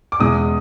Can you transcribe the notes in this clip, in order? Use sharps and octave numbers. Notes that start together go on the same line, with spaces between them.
D6
E2 B2 G#3 D#6